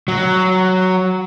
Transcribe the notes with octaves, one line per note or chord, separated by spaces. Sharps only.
F#3